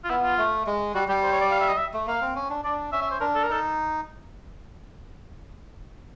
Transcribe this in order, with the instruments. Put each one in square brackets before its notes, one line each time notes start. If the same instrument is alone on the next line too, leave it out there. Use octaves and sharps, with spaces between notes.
[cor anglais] F4
[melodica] B3 [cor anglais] E4
[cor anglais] F4
[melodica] A3
G#3
[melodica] G3 [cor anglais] F#4
[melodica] G3 [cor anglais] G4
[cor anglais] C5
C#5
D5
F5
E5
D#5
E5
[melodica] A3
[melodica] A#3 [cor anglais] F5
[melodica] C4
C#4
D4
[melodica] D4 [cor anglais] D5
[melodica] C#4 [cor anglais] E5
[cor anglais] E5
C5
[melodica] D4 [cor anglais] A#4
[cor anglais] A4
A#4
[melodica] D#4 [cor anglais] A4